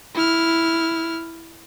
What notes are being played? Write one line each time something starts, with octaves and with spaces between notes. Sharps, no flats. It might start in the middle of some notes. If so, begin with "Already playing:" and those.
E4 F6